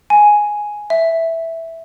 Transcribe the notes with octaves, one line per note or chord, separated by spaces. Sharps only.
G#5
E5